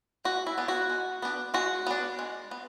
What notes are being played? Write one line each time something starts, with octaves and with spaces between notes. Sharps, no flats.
G#3 F#4
E4
B3 D4
F#4
G#3
B3 D4
G#3 F#4
B3 D4
G#3
B3